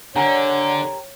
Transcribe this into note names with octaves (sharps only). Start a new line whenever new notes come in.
D3 G4 A#4 C#5 F#5 G#5 A#5